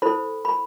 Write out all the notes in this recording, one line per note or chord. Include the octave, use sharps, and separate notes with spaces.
E4 A4 C5 B5
B5